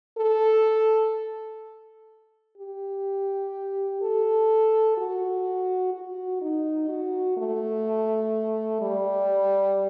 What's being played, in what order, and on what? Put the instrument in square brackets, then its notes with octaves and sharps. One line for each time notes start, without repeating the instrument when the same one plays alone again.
[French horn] A4
G4
A4
F#4
F#4
D#4
F#4
A3
G3